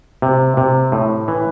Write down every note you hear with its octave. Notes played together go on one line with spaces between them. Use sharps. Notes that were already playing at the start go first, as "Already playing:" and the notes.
C3
C3
A2
E3